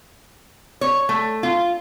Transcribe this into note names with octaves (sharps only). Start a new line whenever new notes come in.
C#5
A3
F4